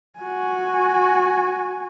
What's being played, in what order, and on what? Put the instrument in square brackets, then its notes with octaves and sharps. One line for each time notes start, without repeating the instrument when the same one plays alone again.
[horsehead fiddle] F#4 G#5